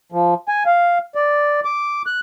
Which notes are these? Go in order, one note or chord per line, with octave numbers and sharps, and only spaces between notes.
F3
G#5
F5
D5
D6
F#6